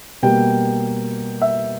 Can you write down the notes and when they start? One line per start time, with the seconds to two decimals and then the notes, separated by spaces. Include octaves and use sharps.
0.23 B2 G3 A#3 G5
1.42 E5